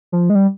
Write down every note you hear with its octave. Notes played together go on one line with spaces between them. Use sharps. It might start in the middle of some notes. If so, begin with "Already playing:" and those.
F3
G#3
G3